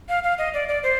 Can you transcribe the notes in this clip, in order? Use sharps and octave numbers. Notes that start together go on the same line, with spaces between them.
F5
F5
D#5
D5
D5
C5